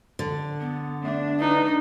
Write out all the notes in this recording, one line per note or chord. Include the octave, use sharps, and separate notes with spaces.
D3
B3
A3 D4
D#4 B4